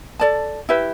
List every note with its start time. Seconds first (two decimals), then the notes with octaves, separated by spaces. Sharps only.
0.20 A4 D5 A5
0.69 E4 G4 B4 E5